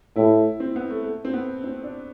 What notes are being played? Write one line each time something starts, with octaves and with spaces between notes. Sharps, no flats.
A2 E4
C4
B3
A3
A3
C4
B3
C4
D4